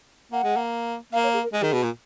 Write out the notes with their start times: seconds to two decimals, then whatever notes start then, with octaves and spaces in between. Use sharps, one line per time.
0.32 A#3 F#5
0.44 G#3
0.56 A#3
1.12 A#3 F5
1.23 C#5
1.33 G#4
1.43 A#4
1.53 G#3 G#4
1.63 D#3
1.73 B2
1.83 A#2